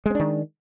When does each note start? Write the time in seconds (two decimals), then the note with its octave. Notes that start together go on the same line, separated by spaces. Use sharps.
0.06 G#3
0.10 C4
0.15 D4
0.20 D#3